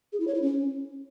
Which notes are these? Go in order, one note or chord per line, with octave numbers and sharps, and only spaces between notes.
G#4
E4
C#5
E4
C#4